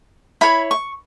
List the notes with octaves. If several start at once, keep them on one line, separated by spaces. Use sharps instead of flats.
E4 C#5 B5
C#6